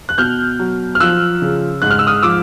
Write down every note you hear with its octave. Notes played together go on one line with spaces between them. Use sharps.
F#6
B2 F6 G6
F#3
F6
F3 E6 F#6
C#3
G#2 F#6
F6
E6
D#6 F6
F3 D6 E6